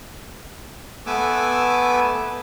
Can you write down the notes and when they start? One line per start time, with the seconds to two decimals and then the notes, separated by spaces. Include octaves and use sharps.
1.06 A3 B3 B4 G#5 D6 E6